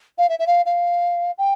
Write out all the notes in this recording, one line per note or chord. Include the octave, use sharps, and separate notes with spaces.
F5
E5
E5
F5
F5
G5